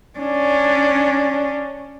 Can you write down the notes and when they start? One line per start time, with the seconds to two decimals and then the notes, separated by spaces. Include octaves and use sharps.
0.19 C#4 D4